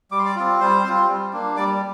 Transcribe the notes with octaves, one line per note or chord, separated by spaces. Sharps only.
G3 D6
C6
D5 D6
C4 F4
G3 C5 C6
C4 F4
G3
A#3 D4
G3 D5 D6